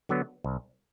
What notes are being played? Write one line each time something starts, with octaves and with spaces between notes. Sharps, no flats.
D3 F#3 B3
C2